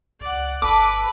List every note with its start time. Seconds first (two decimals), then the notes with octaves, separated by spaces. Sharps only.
0.21 C#2 D5 F#5
0.62 G1 A4 B4 D6